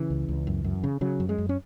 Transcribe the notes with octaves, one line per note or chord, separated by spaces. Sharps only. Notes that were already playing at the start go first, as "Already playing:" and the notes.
Already playing: C#3 E3
C#2
C#2
F#2
F#2
C#3
C#3 F#3
F#2
G#3
F#2
C#4